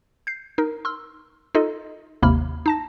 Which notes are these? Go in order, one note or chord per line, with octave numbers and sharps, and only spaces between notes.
G6 C7
D#4 A#4
C6 E6 F6
D#4 F4 A4 D#5
G#1 D#2 C3 A#3 B5 F6
D#4 A5 A#6